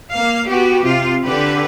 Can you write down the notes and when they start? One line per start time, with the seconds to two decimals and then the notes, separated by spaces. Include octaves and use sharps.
0.11 A#3 F5
0.46 B3 F#4 G4
0.83 C3 F4
1.24 D3 G4 B4